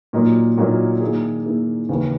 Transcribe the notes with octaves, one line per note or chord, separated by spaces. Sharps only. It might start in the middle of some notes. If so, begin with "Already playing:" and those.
A#2 F#3 A#3 D#4 A#4
A#2 F#3 A#3 D#4 A#4
D#3 A#3 E4 G#4
D#3 A#3 E4 G#4
D#2 C#3 E3